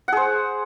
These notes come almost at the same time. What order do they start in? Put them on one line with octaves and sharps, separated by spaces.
F#5 G#4 C5